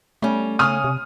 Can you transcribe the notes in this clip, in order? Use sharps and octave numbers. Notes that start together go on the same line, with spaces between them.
G3 A3 C#4
C#3 C#4 G#5 D#6 F6
C3